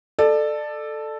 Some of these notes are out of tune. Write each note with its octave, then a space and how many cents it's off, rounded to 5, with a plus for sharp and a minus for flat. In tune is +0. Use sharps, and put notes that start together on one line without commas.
A4 +0 D5 +30